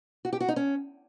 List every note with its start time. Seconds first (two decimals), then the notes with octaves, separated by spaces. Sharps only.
0.25 F#4
0.33 G4
0.40 F#4
0.48 D#4
0.56 C#4